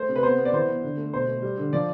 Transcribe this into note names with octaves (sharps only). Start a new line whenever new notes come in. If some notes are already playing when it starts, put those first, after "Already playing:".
Already playing: A3 C5
C3
B4
B3 C5
B3
D5
E3 C5
B3
D3
A3
B2 C5
A3
G3
D3
F3 D5